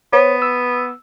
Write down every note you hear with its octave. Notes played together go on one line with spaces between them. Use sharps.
B3 C5 C#5
E6